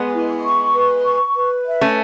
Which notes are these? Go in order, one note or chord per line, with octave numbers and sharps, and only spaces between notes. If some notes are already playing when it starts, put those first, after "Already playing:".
Already playing: G#3 B3 B4
E4
C#6
B4
C#6
B4
E5
A3 C#4